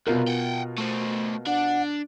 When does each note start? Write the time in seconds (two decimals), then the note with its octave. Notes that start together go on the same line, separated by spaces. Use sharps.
0.07 C2 B2 F4 A#4
0.27 F#5 G5
0.78 A3 C5
1.47 D4 F#5